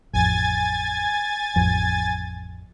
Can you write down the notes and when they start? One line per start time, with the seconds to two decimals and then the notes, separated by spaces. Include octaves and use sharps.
0.13 A1 F2 G#5 G#6 A6
1.56 A1 F2